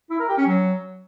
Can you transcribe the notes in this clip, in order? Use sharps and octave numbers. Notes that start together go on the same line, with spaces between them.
E4
A#4
G4
C#4
F#3